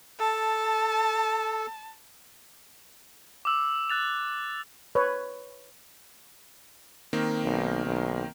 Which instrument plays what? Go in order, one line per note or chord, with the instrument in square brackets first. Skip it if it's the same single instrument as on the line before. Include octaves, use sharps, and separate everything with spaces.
[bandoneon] A4 [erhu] A5
[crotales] D6 E6
F#6 A6 F7
[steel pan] B4 C#5
[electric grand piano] D#3 A#3 C4
[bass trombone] B1
B1